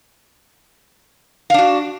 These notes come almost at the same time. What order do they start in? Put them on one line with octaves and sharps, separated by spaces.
F5 D4 F#4